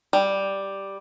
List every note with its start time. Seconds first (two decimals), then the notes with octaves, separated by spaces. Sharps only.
0.13 G3